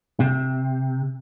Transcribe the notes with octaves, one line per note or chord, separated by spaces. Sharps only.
C3